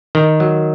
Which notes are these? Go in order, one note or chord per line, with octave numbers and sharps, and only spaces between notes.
D#3
F#3